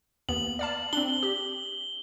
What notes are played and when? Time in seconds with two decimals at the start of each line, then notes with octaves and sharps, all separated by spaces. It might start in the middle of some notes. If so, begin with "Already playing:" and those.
0.29 D#2 A#3 B3 F#7
0.59 D5 F5 A5
0.93 C4 D4 G7
1.23 G4